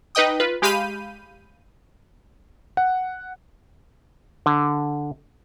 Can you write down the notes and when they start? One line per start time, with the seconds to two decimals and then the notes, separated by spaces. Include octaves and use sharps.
0.15 D#4 B4 D#5 G5 D#6
0.40 F4 B4
0.62 G#3 G4 F5 B5 G6 D#7
2.77 F#5
4.46 D3